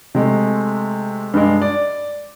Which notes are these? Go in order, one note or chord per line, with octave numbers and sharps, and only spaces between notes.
C3 G#3 A3
G2 G3 G#3
D5